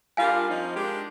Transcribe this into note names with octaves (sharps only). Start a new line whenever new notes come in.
G3 D4 F4 A#4 F5 G#5
F3 C4 D#4
G#3 D4 G4 A#4